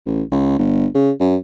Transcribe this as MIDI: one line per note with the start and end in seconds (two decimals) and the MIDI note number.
0.06 0.23 33
0.32 0.58 37
0.59 0.87 31
0.95 1.11 49
1.20 1.37 42